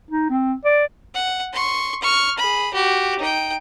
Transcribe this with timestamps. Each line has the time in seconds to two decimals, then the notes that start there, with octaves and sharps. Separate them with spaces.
0.11 D#4
0.30 C4
0.65 D5
1.14 F#5
1.53 C6 C#6
2.02 C#6 F6
2.38 G#4 B5
2.74 F#4 G4
3.19 D#4 G5